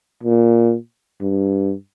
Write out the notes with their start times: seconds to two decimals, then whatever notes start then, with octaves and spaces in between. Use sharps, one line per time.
0.23 A#2
1.21 G2